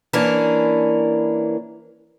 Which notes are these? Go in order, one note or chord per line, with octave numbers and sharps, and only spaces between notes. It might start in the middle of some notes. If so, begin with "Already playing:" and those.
E3 A#3 C#4 D4 A#4